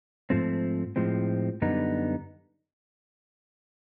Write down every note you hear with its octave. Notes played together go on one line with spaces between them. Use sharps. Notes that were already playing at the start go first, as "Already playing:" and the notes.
G#2 F3 A3 C4
A2 F3 G#3 C4
F#2 D3 G3 B3 D#4